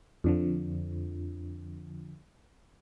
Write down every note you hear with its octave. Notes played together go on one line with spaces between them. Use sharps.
F2 D3 F3